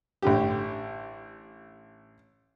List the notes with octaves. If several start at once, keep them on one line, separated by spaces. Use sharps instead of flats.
A1 D3 G4